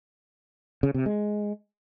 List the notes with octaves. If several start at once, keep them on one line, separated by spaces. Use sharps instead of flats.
C#3
C3
G#3